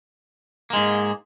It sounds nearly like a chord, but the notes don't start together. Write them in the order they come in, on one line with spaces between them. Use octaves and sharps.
A#3 G#3 G#2